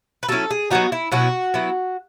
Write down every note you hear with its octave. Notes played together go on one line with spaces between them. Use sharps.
B4
F#3 C#4 E4 A4
G#4
F#3 B3 D#4 F#4
E4
B2 F#3 C#4 E4 F#4
F#3 B3 E4